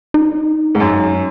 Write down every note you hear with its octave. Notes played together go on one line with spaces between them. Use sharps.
D#4
G#2
F#2